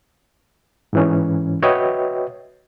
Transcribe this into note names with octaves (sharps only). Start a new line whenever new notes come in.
G#2 E3 C#4
F#4 B4 C#5 D#5 E5 G5